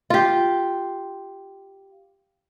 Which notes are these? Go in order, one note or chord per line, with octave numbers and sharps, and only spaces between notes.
F4 G4